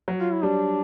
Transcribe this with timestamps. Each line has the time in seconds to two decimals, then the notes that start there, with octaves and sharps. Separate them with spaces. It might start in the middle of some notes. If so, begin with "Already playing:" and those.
0.08 F#3
0.20 F4
0.32 E4
0.43 G3 D4